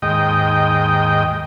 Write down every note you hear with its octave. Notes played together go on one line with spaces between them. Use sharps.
D#2 G#2 D#5 G5